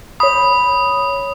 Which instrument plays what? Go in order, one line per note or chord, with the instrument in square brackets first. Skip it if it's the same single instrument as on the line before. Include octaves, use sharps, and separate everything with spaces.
[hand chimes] C#5 B5 [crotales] D#6